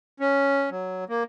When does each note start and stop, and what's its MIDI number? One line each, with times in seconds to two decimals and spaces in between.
0.20 0.70 61
0.71 1.04 54
1.09 1.23 58